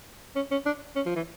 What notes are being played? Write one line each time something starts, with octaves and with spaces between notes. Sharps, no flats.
C#4
C#4
D4
C#4
F3
E3